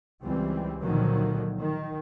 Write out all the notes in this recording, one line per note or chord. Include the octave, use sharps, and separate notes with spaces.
C#2 E3 G3 C4
A#2 D3 D#3 F3 F#3
D#3